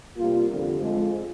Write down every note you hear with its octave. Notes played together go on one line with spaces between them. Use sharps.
C3 G3 A#3 F4
F2 D3 G3 C4
F2 D3 G#3 C4 F4